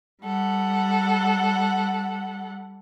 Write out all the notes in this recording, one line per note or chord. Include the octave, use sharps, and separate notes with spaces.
G3 A4 F#5